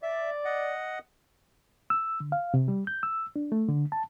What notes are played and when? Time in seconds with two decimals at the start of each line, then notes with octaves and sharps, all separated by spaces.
0.03 D5 E5
0.45 D#5 F#5
1.90 E6
2.20 D3
2.32 F5
2.54 C3
2.68 G3
2.87 G6
3.03 E6
3.36 D4
3.52 A3
3.69 D3
3.92 A5